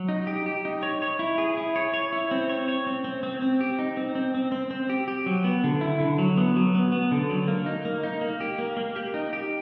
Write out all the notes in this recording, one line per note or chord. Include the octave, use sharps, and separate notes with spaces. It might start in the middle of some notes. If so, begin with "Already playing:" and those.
Already playing: F#3
D#4
G4
G4
D#4
C#5
C#5
E4
G#4
E4
C#5
C#5
E4
C4
C#5
C#5
C4
C4
C4
C4
G4
D#4
C4
C4
C4
C4
C4
G4
G4
F#3
B3
D3
E4
D3
F#3
B3
F#3
B3
B3
D3
F#3
A#3
D#4
A#3
D#4
A#3
G4
A#3
A#3
G4
D#4
G4